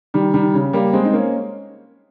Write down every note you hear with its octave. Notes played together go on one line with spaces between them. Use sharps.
D#3 G3
D#3 G3
C#3
G3 A#3
G#3 C4
D#4
A#3 C#4